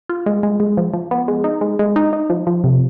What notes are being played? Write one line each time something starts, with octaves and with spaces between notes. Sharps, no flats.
F4
G#3
G#3
G#3
F3
F3
B3
G#3
D#4
G#3
G#3
D#4
D#4
F3
F3
C3